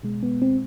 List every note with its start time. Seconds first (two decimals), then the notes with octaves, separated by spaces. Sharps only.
0.03 B2 G#3
0.23 B3
0.42 C4